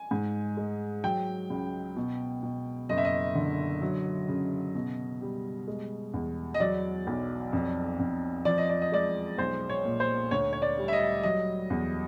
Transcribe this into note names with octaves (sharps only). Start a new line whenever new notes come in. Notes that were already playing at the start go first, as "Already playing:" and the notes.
Already playing: G#5
G#2
G#3
F#3 G5
C#2
B2
B2
F#1 D#5
E5
D#5
D3
F#3
C#3
B2
G3
G#3
E2
D#5
F#3 D5
B1
F2
F2
F3 D5
D#5
D5
D#5
G#3 D5
B1 C5
C#5
A#2
C5
D2 C#5
C#5
D5
G3
E5
D#5
F#3 D#5
E2